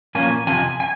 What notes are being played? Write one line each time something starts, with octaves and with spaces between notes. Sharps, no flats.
A#2 F3 A#3 C#4 G#5
F2 C3 F3 G#5
G#5